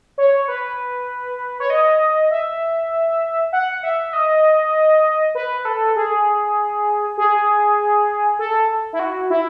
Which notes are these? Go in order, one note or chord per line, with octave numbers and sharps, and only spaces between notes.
C#5
B4
C#5
D#5
E5
F#5
E5
D#5
B4
A4
G#4
G#4
A4
E4
F#4
E4